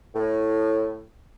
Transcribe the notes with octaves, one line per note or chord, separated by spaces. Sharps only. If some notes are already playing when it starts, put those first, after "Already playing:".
A2